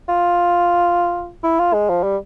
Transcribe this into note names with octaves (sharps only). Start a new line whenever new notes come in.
F4
E4
F4
G#3
F3
G3